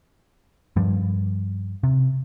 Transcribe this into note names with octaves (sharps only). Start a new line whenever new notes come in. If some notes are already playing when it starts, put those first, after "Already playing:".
G2 F3 G3
C3